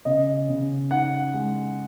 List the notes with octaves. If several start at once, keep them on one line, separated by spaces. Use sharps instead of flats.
C#3 D#5
C#3
D#4 F#5
G#3